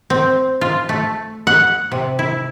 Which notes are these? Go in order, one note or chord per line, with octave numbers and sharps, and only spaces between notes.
C4
F4
A3
F#5
C3
E4